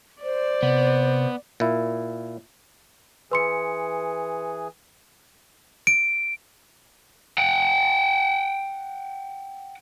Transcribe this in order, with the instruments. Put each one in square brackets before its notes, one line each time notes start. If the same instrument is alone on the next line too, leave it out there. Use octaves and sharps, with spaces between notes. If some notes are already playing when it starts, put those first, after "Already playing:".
[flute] C5 [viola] D5
[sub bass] C3 [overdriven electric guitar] B3
[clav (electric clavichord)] A#2 E4
[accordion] E3 G#4 [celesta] B4 C6 C#7
[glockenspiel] D7
[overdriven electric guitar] F#5 G5